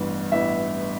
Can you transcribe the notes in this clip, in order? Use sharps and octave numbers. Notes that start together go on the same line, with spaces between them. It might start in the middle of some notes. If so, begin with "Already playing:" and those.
Already playing: A1 G2 E3 B3
A1 G2 E3 B3 E5